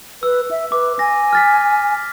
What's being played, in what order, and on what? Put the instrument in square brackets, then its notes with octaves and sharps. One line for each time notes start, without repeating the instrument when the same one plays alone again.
[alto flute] B4 [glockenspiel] E6
[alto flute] E5
[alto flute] B4 [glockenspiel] D6
[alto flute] G#5 [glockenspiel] A#6
[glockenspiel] F6 A6 B6